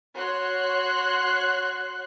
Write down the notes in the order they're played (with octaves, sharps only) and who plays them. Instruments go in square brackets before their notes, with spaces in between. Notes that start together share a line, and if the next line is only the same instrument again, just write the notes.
[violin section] F#4 C#5 C6 F#6